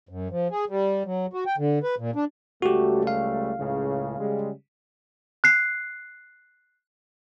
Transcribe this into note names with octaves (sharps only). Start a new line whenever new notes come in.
F#2
F3
G#4
G3
F#3
F#4
G5
D3
B4
A#2
D4
C#2 G3 A3 F#4 G4
F5
C#2 A2 C#3
C#3 G3 G#3
F#6 C7